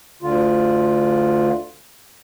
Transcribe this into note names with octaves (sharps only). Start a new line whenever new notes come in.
D2 D3 F4